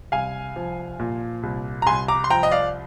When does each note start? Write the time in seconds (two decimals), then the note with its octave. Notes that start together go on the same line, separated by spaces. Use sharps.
0.12 C2 F5 G#5
0.56 F3
0.99 A#2
1.43 C2
1.82 A#5
1.86 C2 G#5 C6
2.08 A#5 D6
2.24 C6
2.30 F3 G5 A#5
2.43 D#5
2.51 D5 F5